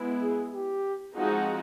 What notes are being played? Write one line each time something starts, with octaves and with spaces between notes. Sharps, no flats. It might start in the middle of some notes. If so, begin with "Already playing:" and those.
Already playing: G#3 B3 E4
G#4
G4
F3 G#3 C4 D#4 F#4 G#4